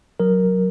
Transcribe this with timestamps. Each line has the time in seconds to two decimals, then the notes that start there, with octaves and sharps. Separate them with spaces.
0.20 F#3 A#4